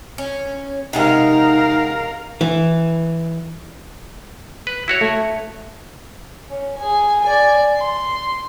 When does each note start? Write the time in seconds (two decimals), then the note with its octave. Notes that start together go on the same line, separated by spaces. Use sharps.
0.18 C#4
0.93 C3 G#3 D#4 A#4 F5 F#5
2.41 E3
4.67 B4
4.88 E4 F#4 C#5
5.01 A3
6.49 C#4
6.78 G#4 G#5
7.21 D5 G#5
7.77 C6